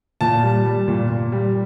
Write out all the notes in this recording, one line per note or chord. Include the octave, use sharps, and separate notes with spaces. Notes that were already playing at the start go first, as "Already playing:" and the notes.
A#2 A5
G3
G3
A#2
A#2
G3